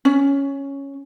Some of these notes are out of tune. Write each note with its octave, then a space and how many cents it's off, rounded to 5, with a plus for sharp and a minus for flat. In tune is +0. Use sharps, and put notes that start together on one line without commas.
C#4 -5